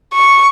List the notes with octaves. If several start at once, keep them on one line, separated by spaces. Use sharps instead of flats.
C#6